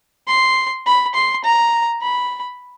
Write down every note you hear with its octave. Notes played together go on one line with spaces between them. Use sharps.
C6
B5
C6
A#5
B5